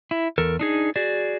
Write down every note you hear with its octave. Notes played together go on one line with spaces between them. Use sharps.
E4
E2 A4 A#4
D4 D#4 G#4
F#4 G#4 D5